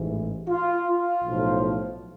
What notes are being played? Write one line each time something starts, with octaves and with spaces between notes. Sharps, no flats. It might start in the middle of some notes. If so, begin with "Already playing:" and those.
Already playing: A1 G#2 E3
F4
F4
B1 A2 F3